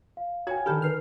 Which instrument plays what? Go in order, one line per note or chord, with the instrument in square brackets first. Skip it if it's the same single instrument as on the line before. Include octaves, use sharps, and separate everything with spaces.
[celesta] F5
[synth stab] F#4 [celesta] C#5 G#5 [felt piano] F5 G5 G#6
[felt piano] D3 D#3 [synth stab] G4 A4 [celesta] B5 F6 G6
[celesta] D#4 B4 C7 [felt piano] A#4 [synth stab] F6